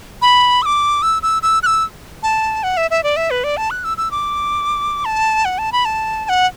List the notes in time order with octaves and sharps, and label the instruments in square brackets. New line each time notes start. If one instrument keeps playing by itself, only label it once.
[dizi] B5
E6
D6
E6
E6
E6
F#6
E6
A5
F#5
E5
E5
D5
E5
B4
D5
A5
F#6
E6
E6
D6
A5
F#5
A5
B5
A5
A5
F#5